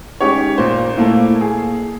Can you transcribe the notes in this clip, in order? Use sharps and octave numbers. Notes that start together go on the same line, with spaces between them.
G#3 C#4 D#4 G4 C#5
A#2 A#3 C5
A#2 A3 A#3 E4
G#4